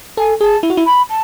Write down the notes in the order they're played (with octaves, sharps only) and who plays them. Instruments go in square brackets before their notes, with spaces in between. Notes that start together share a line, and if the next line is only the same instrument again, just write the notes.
[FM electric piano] A4 [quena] G#5
[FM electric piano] G#4 [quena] A5
[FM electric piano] E4
F#4
E4
[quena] B5
A5